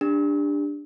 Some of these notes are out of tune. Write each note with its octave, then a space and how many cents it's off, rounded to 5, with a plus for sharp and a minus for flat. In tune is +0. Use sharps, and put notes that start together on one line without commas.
D4 +0 G4 +35